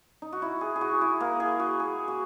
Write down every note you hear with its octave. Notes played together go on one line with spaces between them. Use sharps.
D#4
F#4
E4
G#4
G#4
F#4
E4
A#3
G#4
F#4
G#4
F#4